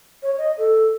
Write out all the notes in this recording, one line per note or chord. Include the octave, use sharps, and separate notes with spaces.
C#5
D#5
A4